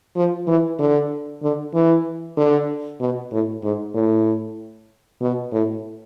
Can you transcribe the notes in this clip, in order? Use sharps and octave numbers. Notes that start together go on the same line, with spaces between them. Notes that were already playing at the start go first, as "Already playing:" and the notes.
F3
E3
D3
D3
E3
D3
B2
A2
G#2
A2
B2
A2